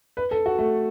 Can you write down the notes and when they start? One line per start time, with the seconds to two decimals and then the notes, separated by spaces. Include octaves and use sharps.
0.17 B4
0.31 A4
0.46 F#4
0.59 A3